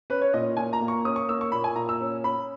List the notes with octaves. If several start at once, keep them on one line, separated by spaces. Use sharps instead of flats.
C#4 B4
C#5
A#2 D#5
A#2 G#5
A#5
A#3
C#6
C#4 D#6
C#6
A#3 E6
C#6
A#2 B5
G#5
A#2 A#5
E6
C#4
C#4 B5